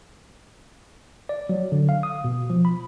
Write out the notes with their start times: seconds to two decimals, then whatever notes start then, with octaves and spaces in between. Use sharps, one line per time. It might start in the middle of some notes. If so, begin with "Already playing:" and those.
1.29 D5
1.49 F#3
1.72 D3
1.89 F5
2.03 D#6
2.24 B2
2.50 F3
2.65 B5